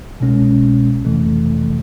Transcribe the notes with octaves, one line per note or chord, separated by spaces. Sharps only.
C2 B2 G#3 C#4
F2 C3 E3 A3